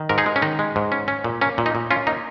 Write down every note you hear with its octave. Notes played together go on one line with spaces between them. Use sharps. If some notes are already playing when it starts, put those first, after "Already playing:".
Already playing: D#3
G#2 A#4
D#4 G#4
G#3
C#4
D#3 D#4
G#3
G#2
C#4
C#4
A#2
A#3 C#4
A#2
D#4
A#2
C#4 F4
A#3 D#4